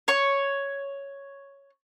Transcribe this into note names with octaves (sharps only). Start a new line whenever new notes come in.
C#5 C#6